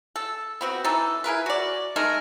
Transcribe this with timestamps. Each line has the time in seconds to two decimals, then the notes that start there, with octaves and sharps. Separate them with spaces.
0.16 A4
0.61 B3 C4 F#4
0.84 E3 D#4 A4
1.24 E4 G#4 A#4 B4
1.46 F#4 D5
1.96 G#3 A3 D#4 A#4